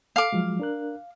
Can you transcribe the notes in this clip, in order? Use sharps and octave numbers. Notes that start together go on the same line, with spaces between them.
A4 F5 D6
F3 F#3 G#3
D4 A#4 F#6